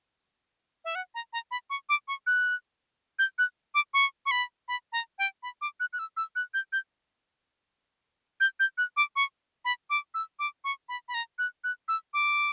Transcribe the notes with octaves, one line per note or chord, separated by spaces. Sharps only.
E5
F#5
A#5
A#5
B5
C#6
D6
C#6
F#6
G6
F#6
D6
C#6
C#6
B5
B5
A#5
G5
B5
D6
F#6
F#6
E6
E6
F#6
G6
G6
G6
G6
F#6
D6
C#6
B5
D6
E6
D6
C#6
B5
B5
A#5
F#6
F#6
E6
D6